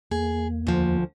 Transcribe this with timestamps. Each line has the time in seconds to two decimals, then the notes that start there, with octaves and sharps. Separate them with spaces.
0.11 E2 A#3 G#4
0.67 D2 F3